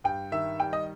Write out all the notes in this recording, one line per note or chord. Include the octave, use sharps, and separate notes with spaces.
G2 G5
D#3 E5
G3 G5
D#5